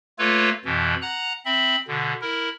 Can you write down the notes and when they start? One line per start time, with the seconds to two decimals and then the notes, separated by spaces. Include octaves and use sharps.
0.19 A3 A#3 F4 A4 B4 C#5
0.65 F2 B2 E3
1.02 F#5 A#5 F#6
1.45 C4 E5 B5
1.88 B2 D3
2.21 E4 A#4